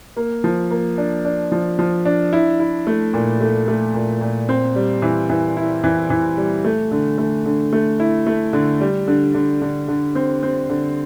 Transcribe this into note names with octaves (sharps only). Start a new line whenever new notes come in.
A#3
F3
A#3
D4
D4
F3
F3
D4
E4
E4
A3
A#2
A3
A3
A#2
A#2
C4
G3
E3
E3
E4
E3
E3
G3
A3
D3
A3
D3
A3
E4
A3
D3
G3
D3
D3
D3
D3
C4
C4
D3